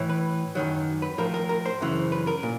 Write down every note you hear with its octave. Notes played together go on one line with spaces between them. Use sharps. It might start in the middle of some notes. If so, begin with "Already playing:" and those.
Already playing: A2 E3
B4
F#2 D#3 F#3
B4
A2 F3 A#4
A#4
A#4
C5
F#2 C#3 E3
B4
A#4
A#2